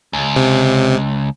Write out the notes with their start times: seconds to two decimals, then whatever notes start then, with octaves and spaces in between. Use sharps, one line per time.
0.13 C#2
0.36 C3